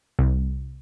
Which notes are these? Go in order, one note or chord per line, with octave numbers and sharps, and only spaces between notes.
C2